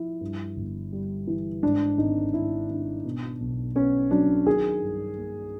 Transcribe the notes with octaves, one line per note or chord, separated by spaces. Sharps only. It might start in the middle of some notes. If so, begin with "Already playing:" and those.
Already playing: F3 E4
G2
G1
G3
E3
G#2 D4
G#1 D#4
G#1 E4
D#3 D4
B2
B1
B3 C#4
F#3 D4
D#3 G#4
G2
A#3